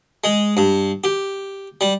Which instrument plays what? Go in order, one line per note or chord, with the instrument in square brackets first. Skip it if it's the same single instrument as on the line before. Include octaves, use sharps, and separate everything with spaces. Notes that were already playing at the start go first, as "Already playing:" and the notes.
[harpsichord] G#3
G2
G4
G3